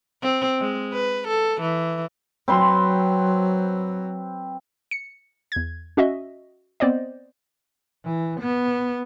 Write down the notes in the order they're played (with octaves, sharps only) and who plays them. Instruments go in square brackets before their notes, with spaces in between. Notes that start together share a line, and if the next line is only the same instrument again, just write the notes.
[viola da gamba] C4
G#3
B4
A4
E3
[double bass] F#3 [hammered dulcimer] C4 B4 C6
[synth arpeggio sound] C#7
E2 G#6
C#4 F#4 D#5 E5
B3 C4 C5 D5 D#5
[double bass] E3
B3